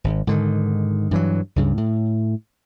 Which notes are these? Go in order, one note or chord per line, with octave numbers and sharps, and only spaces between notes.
G#1
G#2 D3 D#3
G2 E3 F#3
C#2 G2 C#3
A2